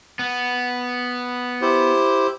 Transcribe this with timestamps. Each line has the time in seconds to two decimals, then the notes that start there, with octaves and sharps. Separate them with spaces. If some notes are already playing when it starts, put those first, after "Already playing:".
0.19 B3
1.62 E4 G4 C5